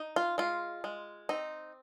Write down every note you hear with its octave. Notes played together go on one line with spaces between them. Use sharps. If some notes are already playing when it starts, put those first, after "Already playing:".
Already playing: D#4
F4
G#3 F4
G#3
C4 D#4